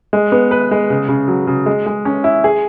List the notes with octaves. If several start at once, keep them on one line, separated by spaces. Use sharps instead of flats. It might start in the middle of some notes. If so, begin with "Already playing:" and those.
G#3
B3
B4
G#3
C#3
C#3
F#3
C#3
G#3
G#3
C#4
E4
G#4